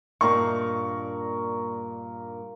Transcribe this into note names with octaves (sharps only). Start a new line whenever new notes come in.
G2 A#2 A#3 D#4 A#4 C#6